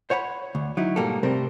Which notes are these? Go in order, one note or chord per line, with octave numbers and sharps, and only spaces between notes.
C5 C#5 F#5 A5 B5
D2
F#3 D#4 E4
G#2 B2 G3 A#3 G4 A4
C3 G3 A3 C4 A#4 C5